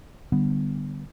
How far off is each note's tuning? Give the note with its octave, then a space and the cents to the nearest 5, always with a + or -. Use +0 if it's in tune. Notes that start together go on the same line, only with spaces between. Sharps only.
D3 +15 G3 -5 B3 +0